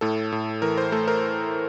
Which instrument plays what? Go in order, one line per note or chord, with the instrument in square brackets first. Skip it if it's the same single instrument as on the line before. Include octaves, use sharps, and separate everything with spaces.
[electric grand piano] A2 A4
A2
E3 A#4
C5
A3 A4
A#4